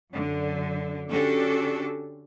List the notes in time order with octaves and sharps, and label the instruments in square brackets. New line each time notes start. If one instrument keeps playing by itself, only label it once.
[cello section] F#2 D3
D3 C#4 D4 F#4 G4 A4